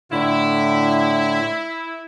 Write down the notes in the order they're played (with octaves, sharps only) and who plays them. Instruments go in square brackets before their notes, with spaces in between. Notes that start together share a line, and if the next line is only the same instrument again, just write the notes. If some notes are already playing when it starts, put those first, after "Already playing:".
[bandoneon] A2 D3 [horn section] E4